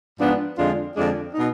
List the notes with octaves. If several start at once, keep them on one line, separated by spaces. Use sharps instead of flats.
G#2 F3 B3 D4
F2 D3 G#3 D4 F4
F2 D3 F3 G#3 D4
B2 B3 D#4